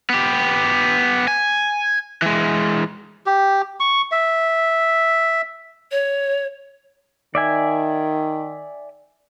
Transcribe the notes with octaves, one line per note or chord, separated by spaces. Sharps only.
B3 G4
G#5
E3 G#3
G4
C#6
E5
C#5
D#3 D5 E5 G#5